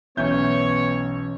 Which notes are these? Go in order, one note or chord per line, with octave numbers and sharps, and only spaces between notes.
B1 E3 B3 C#4 C#5 E5 G6